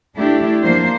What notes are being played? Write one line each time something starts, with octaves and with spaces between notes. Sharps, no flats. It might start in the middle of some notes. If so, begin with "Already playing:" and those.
A3 D4 E4 G4
F3 A#3 D4 C5